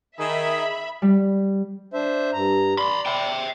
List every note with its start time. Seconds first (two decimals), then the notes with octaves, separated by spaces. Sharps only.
0.19 D#3 G#4 E5 B5
1.02 G3
1.94 D4 C5 E5
2.33 G2 A#5
2.78 D5 B5 C6
3.06 E5 G5